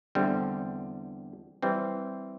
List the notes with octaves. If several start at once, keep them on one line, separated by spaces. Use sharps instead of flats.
E2 D3 G3 C4
E3 G3 C4